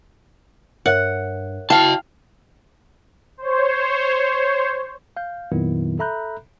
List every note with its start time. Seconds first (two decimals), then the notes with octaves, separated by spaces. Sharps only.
0.86 G2 A#4 C#5 E5 F#5
1.70 E4 F#4 F5 G5 A5
3.37 C5 C#5
5.17 F5 G6
5.52 F2 A#2 D#3 F#3 B3 E4
5.99 A4 E5 A#5 B5 F#6 G6